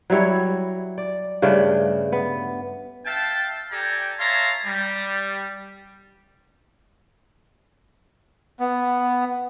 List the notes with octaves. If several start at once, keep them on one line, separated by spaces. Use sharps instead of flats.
F#3 G3 E4 C#5
D5
G2 C#3 A3 D4
B3
E5 F5 G5 A5
G4 A4 D5 G5 G#5 A#5
C#5 E5 F5 A5 A#5 C6
G3
B3